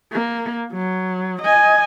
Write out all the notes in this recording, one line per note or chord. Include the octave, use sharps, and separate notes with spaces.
A#3
F#3
D#5 G#5